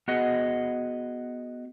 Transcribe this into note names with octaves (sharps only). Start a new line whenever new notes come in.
B3 F#4 G#4 D#5